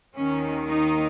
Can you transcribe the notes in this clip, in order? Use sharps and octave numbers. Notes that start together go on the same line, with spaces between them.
D#2 D#3 C#4
D#4